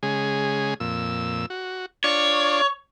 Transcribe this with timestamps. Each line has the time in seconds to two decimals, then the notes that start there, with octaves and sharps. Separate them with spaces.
0.03 C#3 G#3 G#4
0.80 F2 A#2 E6
1.50 F#4
2.04 D4 F4 C#5 D5